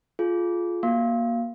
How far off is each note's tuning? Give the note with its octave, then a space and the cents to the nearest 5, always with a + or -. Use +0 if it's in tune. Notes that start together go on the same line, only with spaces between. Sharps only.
F4 +0 G#4 +30
A#3 +20 F#4 +0 F5 -10